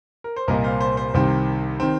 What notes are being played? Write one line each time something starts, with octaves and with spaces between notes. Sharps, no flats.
A#4
C5
C2 A#2 A#3 A#4 D#5
C5 F5
C5
C5
C2 C3 D#3 C4
D#3 C4